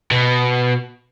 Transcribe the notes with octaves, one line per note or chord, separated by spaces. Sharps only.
B2